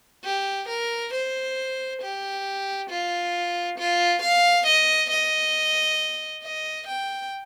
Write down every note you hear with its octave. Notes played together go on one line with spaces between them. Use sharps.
G4
A#4
C5
G4
F4
F4
F5
D#5
D#5
D#5
G5